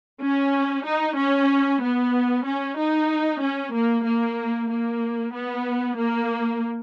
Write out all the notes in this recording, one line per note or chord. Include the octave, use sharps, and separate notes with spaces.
C#4
D#4
C#4
B3
C#4
D#4
C#4
A#3
A#3
A#3
B3
A#3